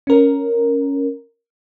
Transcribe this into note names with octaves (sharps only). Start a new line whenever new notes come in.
C#4 A#4